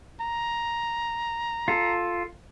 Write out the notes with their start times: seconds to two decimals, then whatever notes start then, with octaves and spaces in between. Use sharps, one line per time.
0.21 A#5
1.68 F4 A4